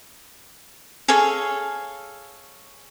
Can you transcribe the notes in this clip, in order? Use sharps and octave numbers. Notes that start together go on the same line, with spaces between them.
G#4 A4 C#5 F5